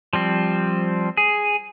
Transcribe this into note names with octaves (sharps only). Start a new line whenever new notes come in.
F3 G3 C4
G#4